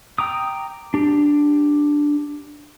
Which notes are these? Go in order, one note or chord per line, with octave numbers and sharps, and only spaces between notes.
G5 A#5 D6 D#6
D4 G4